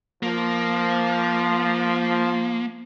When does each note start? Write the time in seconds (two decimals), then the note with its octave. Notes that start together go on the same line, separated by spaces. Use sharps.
0.23 F3 A#3